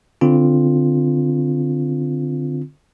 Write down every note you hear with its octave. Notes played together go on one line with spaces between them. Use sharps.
D3 C4 F4